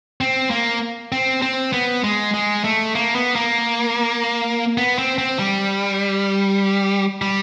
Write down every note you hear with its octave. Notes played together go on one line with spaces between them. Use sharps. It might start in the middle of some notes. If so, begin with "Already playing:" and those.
C4
A#3
C4
C4
B3
G#3
G#3
A3
A#3
B3
A#3
B3
C4
C4
G3
G3